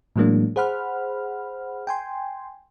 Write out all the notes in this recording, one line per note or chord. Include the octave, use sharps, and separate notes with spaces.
A2 E3 F#3 G#3 A#3 D4
G#4 C5 F#5 B5 F6
G5 G#5 C6